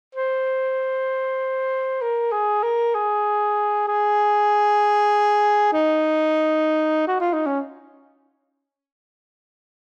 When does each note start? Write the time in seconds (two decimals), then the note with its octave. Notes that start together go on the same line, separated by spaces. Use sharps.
0.15 C5
2.01 A#4
2.32 G#4
2.63 A#4
2.94 G#4
3.88 G#4
5.73 D#4
7.07 F#4
7.20 F4
7.33 D#4
7.46 C#4